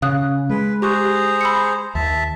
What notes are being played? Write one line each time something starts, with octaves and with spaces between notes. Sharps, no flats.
C#3 F5 D#6 F#6
G#3 B4
G4 G#4 C5 A#5 C#6 F#6
B5 E6 C#7
D#2 E5 A5